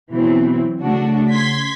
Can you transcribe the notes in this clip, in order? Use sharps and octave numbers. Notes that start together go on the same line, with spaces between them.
B2 E3 F#3 C4
C#3 A3 D4 F#4
C6 G#6 B6